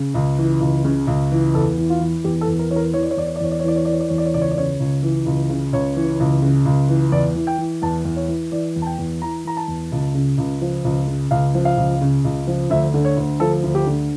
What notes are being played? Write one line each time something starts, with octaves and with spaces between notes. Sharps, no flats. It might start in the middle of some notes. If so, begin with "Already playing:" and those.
Already playing: C#3
C#2
E3
C#2
C#3
C#2
E3
E2 A4
E3
F4
E3
E2 G4
A4
E2
A#4
E3 C#5
A#4
E3 C#5
D5
C#5
E2 D5
C#5
D5
E2 C#5
D5
C#5
E3 D5
C#5
E3 D5
C#5
D5
E2 C#5
D5
C#5
C#2 D5
C#5
D5
C#3 C#5
C#2
E3
C#2
C#3
C#2 C#5
E3
C#2
C#3
C#2
E3
E2 D5
E3
G5
E3
E2 A5
E2
C#5
E3
E3 D5
E2
A5
G5
E2
E3 A#5
E3 A#5
A5
E2
C#2
C#3
C#2
F3
C#2
C#3
C#2 F5
F3
F5
C#2
C#3
C#2
F3
D2 E5
D3
C#5
D2
F3 A4
D2
G4
D3